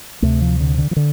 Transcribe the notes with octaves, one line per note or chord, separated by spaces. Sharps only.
D2 C3 A3
F3
D3
D3
F3
D3